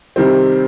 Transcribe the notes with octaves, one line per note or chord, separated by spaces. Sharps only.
C3 D#3 G3 C4